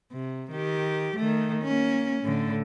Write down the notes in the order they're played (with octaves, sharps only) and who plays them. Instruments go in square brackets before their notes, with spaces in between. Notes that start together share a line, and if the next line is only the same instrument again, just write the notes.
[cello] C3
D#3 G4
D#3 A3
A#3 C#4
A2 D3